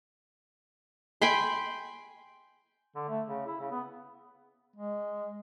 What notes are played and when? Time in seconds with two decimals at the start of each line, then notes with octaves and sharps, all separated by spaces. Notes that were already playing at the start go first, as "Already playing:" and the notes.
1.22 G5 G#5 B5 C6
2.95 D3
3.09 A3
3.26 C#3
3.47 E4
3.60 C#3
3.71 B3
4.76 G#3